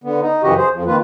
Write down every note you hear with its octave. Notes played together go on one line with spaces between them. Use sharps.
D3 B3
D#4
F#2 C#3 E3 F#4 G4 D#5
G#4 C5
F2 F3
D#3 A#3 F4 B4